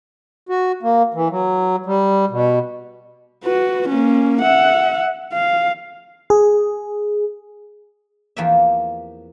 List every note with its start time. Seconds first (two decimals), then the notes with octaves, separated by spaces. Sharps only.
0.49 F#4
0.83 A#3
1.14 E3
1.30 F#3
1.86 G3
2.30 B2
3.43 F#4 B4
3.89 A#3 C#4
4.42 E5 F#5
5.33 F5
6.30 G#4
8.37 E2 F3 A#3 C4 G4 E5